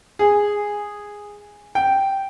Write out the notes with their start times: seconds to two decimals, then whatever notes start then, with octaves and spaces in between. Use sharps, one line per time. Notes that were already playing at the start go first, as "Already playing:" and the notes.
0.19 G#4
1.75 G5